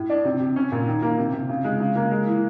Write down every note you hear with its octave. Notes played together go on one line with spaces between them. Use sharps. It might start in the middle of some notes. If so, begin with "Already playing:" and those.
Already playing: A2
D4
C3
C3
C#4
A#2
D#3
A#3
C3
C3
C#3
G#3
C#3
A#3
G#3
E3